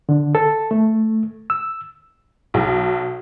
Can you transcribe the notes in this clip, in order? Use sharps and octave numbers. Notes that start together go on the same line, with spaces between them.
D3
A4
A3
E6
B1